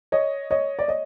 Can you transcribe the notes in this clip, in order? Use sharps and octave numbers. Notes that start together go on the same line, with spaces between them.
C#5 D#5
C#5 D#5
D5
C#5 D#5